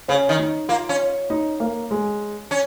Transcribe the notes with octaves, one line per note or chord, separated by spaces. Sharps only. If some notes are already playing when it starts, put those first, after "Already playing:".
C#3 C#4
D#3
D#4
A#3 F4
C#4
D#4
A#3
G#3
C#4